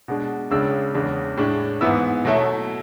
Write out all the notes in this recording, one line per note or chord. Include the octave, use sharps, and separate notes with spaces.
B2 G#3 D4
C#2 C#3 G#3 D4 E6
E2 C#3 G#3 D4
A2 G#3 D4
G#2 E3 B3 E4 E6
B2 F#3 A3 E4